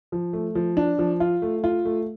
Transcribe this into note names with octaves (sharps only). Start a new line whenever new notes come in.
F3
A3
F3
D4
F3
F4
A3
F4
A3